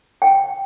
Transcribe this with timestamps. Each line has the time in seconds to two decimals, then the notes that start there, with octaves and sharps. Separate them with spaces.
0.22 G5